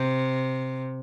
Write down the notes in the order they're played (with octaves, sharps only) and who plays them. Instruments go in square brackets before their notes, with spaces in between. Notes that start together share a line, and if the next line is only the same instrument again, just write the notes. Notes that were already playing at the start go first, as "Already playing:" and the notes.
Already playing: [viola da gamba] C3